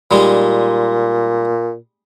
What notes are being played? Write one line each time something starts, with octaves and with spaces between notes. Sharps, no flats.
A#2 G3 G#3 D#4